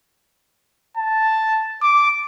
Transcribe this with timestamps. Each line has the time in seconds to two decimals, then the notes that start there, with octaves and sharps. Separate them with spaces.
0.98 A5
1.82 D6